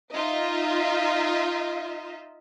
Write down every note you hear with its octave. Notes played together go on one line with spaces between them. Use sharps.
D#4 F4 D#5 E5